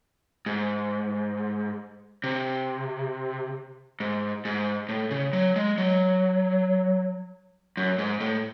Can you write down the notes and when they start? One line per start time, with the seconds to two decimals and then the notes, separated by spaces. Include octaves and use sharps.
0.46 G#2
2.24 C3
4.00 G#2
4.45 G#2
4.89 A2
5.11 C#3
5.33 F#3
5.56 G#3
5.78 F#3
7.77 F#2
7.98 G#2
8.20 A2